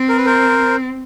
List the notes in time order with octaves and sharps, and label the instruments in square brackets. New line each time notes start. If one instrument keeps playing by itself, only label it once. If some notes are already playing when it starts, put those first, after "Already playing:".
Already playing: [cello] C4
[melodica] A#4
B4
A#4 C5